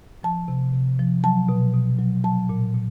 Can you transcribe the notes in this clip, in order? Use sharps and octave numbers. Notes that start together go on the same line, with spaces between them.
F3 A5
C3
C3
F3
F#3 A5
B2
B2
F#3
F#3 A5
A#2
A#2